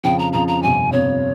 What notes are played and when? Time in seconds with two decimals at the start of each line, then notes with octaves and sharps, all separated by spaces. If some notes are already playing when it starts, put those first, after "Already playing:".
0.04 F2 C#3 F3 G5
0.19 A#5
0.33 F2 C#3 F3 A#5
0.48 A#5
0.62 G1 F2 C3 G#5
0.92 G1 F2 C3 C#5